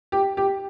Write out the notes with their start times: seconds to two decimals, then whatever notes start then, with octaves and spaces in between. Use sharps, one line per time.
0.12 G4
0.37 G4